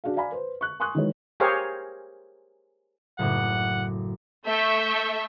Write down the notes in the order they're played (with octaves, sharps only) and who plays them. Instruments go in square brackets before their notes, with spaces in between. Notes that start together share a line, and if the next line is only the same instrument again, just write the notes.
[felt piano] D4 F#4 G#4 F5
D5 F5 G#5 A#5 B5
B4 C5
C#6 F#6
G#5 C6 C#6 D#6 F#6
D#3 E3 F#3 G#3 B4 C#5
[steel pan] G4 G#4 A#4 C5 C#5 F5
[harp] F#1 A2 D6 [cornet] F#5
[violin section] A3 E5 C#6 G6